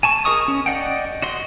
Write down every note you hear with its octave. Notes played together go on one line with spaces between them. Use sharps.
G#5 A5 C#6
G#4 A#4 D#5 C#6 D#6
C#4
D5 D#5 F#5 G5
F#4 D#5 C6